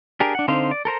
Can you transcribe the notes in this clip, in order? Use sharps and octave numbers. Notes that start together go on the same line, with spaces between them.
D4 G4 G#4 A#4
D4 F#5
D3 C4 D#4 C5 F5
D5
A4 A#4 C5 A#5